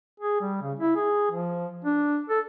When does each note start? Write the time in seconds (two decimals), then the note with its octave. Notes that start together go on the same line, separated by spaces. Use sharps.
0.20 G#4
0.41 G3
0.62 C#3
0.79 E4
0.96 G#4
1.31 F3
1.85 D4
2.30 A4